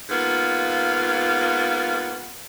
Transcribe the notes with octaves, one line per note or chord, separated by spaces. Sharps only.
G#2 A#3 B3 F4